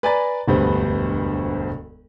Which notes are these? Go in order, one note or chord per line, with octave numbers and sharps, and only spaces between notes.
B4 D5 G#5 A#5 B5 A6
E1 D2 G2 B3 C5